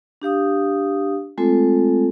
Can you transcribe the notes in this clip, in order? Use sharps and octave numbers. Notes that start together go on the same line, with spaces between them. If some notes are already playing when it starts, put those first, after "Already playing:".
D4 G4 F5 D#6
G#3 A3 C4 F4 A4